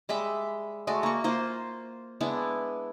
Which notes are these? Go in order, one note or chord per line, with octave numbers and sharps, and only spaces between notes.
G3 G#3 E5 B5
G#3 A3 F#4 D5
A#3 C#6
A#3 F4 C5
G#3 B3 D4 E4